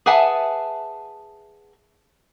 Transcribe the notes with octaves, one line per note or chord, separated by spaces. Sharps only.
G#4 B4 E5 F#5 G#5 A5